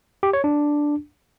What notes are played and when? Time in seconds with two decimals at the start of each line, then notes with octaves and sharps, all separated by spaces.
0.23 G4
0.33 C#5
0.44 D4